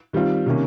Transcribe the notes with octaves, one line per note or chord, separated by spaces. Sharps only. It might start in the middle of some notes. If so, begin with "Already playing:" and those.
D#3 G3 C4 F4
C3 D#3 A#3 C#4